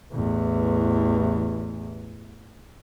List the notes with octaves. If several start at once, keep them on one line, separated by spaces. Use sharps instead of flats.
A1 E2